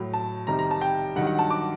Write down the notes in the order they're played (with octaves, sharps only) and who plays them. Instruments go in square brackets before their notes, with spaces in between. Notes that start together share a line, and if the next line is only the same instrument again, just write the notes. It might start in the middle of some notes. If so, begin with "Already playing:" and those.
Already playing: [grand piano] A2 F#3
A5
C2 C3 D#3 G3 A#5
A#5
A5
G5
G2 D#3 F#3 F#5
F#5
A5
D6